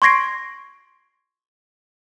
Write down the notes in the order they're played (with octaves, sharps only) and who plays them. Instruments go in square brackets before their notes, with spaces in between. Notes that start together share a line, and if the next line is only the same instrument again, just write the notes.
[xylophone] C6 C#6 G#6 A#6 C7 D7